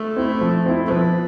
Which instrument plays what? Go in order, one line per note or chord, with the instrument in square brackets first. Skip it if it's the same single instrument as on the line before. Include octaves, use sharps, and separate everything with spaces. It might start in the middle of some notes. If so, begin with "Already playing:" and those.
Already playing: [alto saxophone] A3
[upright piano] C4 E4
F3
C4 E4
[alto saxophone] A3
[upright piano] F3 [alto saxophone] B3